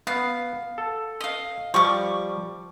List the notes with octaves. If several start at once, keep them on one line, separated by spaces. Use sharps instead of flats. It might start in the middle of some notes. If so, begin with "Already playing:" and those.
B3 F5
A4
D#5 F5
F3 G3 C#6 D6